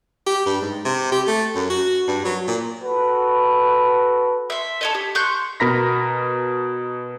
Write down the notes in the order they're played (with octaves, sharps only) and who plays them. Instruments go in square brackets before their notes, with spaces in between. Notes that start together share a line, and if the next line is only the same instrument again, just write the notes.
[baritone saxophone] G4
G2
G#2
C3
G4
A3
F#2
F#4
G2
F#3
A#2
[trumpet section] F#4 A4 B4
[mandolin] E5 C6
A4 C#5 D#5
G4
C6 C#6 F#6 G6
[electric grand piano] B2 A#4 A#5 B5 A#6 B6